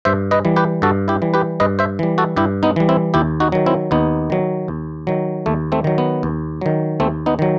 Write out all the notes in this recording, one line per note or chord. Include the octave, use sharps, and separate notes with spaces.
G2 C5 E5
B4 D#5
E3 G3
G4 B4
G2 F#4 A4
E4 G4
E3 G3
G4 B4
G2 B4 D#5
C5 E5
E3 G3
F#4 A4
G2 E4 G4
B3 D#4
E3 G3
C4 E4
D#2 E4 G4
D#4 F#4
D#3 F#3
C4 E4
D#2 B3 D#4
D#3 F#3
D#2
D#3 F#3
D#2 A3
A3 C4
D#3 F#3
B3
D#2
D#3 F#3
D#2 A3 C4
B3 D#4
D#3 F#3